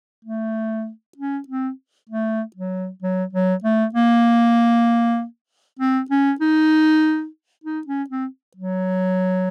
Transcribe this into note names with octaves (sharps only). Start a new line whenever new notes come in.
A3
C#4
C4
A3
F#3
F#3
F#3
A3
A#3
C4
C#4
D#4
D#4
C#4
C4
F#3